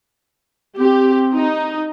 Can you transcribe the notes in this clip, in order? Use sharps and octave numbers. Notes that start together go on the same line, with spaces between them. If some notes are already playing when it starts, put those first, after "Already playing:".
C4 G4
D#4